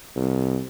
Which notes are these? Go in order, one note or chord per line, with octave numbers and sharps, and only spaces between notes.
C2